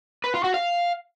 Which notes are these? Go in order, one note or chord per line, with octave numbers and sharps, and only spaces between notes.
B4
F4
F#4
F5